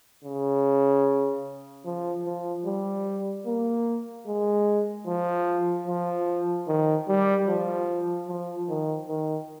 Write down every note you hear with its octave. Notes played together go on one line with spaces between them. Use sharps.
C#3
F3
F3
G3
A#3
G#3
F3
F3
D#3
G3
F3
F3
D#3
D#3